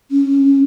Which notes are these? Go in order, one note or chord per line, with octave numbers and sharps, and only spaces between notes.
C#4